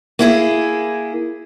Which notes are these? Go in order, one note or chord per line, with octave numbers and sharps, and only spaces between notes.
A#3 E4 G#4